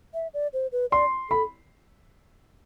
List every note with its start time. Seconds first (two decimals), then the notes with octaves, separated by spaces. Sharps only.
0.14 E5
0.34 D5
0.53 C5
0.72 B4
0.91 D5 C6
1.30 A4 B5